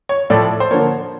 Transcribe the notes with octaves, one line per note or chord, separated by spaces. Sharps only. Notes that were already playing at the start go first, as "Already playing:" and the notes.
C#5
A2 F3 A3 D5
C5
D3 F3 A#3 C#5